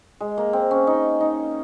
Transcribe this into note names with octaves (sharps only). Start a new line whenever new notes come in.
G#3
A#3
C4
C#4
D#4
D#4